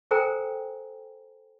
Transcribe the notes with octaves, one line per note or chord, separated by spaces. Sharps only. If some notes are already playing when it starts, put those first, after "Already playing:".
A4 A#4 C5 G5 G#5 A#5